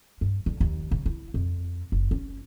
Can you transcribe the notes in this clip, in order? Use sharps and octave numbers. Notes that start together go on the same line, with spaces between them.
G2
D3
D#2
C#3
E4
F2
F#1
C#4